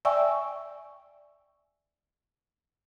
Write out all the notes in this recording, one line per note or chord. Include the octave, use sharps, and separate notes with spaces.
D5 E5 G5 G#5 C#6 E6